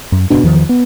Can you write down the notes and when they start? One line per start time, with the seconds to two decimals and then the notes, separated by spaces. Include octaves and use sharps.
0.12 F#2
0.30 F#1 B2 D4
0.43 E2 D3 D#3 F3
0.69 B3